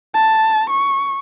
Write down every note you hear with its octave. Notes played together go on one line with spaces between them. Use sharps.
A5
C#6